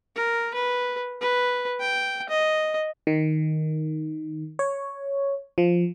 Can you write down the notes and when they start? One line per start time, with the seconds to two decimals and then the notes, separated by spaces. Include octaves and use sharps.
0.16 A#4
0.54 B4
1.21 B4
1.80 G5
2.29 D#5
3.07 D#3
4.59 C#5
5.58 F3